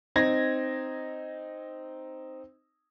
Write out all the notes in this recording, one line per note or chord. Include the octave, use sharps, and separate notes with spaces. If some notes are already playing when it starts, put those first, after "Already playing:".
C4 D#4 G#6 A#6